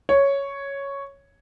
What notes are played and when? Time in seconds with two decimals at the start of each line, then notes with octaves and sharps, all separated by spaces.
0.09 C#5